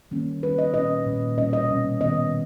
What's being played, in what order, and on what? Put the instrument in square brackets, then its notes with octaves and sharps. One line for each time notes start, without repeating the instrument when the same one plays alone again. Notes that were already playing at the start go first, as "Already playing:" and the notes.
[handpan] D#3 G3 A#3 C#4
D#3 G3 A#3 C#4 B4
D#5
A#2 G3 C#4 D#5
A#2 G3 C#4
B2 G3 C#4 D#5
D#5
B2 G3 C#4
D#3 G3 B3 D#5